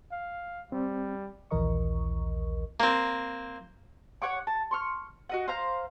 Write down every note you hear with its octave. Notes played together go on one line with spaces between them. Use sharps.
F5
G3 C4
A#1 D#2 E3 A#4 D#5 C#6
A#3 C4
C#5 F#5 C#6 D6
A5
C6 C#6 F6
F#4 D#5 F#5
C5 F5 A#5